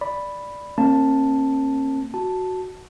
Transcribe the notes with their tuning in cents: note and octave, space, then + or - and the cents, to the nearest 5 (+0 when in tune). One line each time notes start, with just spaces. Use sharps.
D5 +0 B5 +0
A#3 -15 C#4 -45 A5 +0
F#4 +0 A5 +0